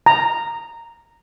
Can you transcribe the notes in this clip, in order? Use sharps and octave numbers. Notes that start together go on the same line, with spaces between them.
A#5